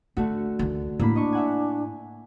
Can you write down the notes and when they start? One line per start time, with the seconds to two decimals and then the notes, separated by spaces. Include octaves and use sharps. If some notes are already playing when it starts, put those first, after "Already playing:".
0.17 D3 A3 D4 F#4
0.59 D2 D#3
1.00 A2 A#3 D4 B5
1.15 D4 D#5 C#6
1.32 E5 F#5 G#5